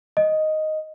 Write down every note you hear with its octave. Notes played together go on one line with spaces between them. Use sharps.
D#5